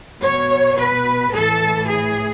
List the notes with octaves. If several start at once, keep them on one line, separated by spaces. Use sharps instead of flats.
B2 C#5
B4
A2 E3 A4
G#4